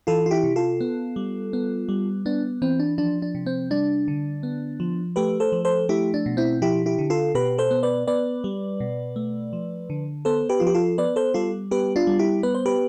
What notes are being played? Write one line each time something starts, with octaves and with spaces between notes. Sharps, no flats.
E3 F4 A4
F4
E4 G4
C3
F4 A4
B3
G3
B3
G3
B3 D4
E3 C4
D4
F3 D4
D4
C3
C4
G3 D4
D3
B3
F3
A3 G4 B4
A4 C5
F3
A4 C5
A3 E4 G4
D4
B2
C4 E4
F3 E4 G4
E4 G4
D3
F4 A4
B2 G4 B4
A4 C5
B3
B4 D5
B3 B4 D5
G3
B2
A3
F3
D3
B3 A4 C5
G4 B4
F3 F4
G4
F4 A4
B3 B4 D5
A4 C5
G3 F4 A4
B3 G4 B4
D4 F4
G3
E4 G4
B3 B4
C5
G4 B4